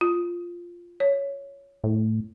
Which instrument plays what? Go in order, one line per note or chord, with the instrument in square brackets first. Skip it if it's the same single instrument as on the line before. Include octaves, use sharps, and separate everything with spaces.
[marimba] F4
C#5
[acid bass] A2